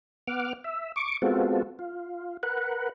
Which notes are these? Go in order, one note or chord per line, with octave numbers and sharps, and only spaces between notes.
B3 F#5 D6 F6
E5
C#6 D6
G#3 B3 C4 F4 F#4 A4
F4
A#4 B4 F#5